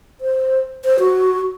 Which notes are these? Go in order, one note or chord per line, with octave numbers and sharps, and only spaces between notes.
C5
C5
F#4